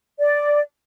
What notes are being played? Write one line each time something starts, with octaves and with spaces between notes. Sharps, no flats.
D5